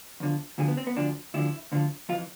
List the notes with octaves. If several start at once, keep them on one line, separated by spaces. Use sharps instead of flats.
E2 D3 F3
D2 D3 F3 G#4
B3
C4
B3
D2 D3 F3 D4
D2 D3 F3 E4
D2 D3 F3
F2 E3 F4